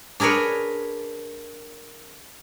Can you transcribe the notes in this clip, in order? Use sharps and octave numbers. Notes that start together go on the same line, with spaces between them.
D4 G#4 A#4 B4 C#5